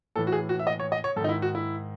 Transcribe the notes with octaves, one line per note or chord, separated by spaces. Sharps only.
A2 E3 A4
F#4
G#4
F#4
E5
D#5
C#5
D#5
C#5
G#2 D#3 D#4 A4
E4
F#4
E4